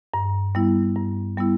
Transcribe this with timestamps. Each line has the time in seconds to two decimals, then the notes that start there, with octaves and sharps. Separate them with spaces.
0.14 G2
0.55 G3 B3 E4
0.96 G2
1.37 G3 B3 E4